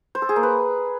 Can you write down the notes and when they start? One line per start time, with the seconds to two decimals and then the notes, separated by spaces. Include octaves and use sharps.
0.15 C5
0.22 A4
0.29 G#4
0.36 A#3
0.43 B4